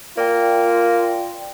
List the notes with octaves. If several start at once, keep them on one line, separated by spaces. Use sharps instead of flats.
A#3 F4 D5 G5